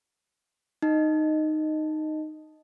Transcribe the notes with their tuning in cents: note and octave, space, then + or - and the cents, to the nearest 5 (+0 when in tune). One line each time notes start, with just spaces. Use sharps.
D#4 -10 D#5 +0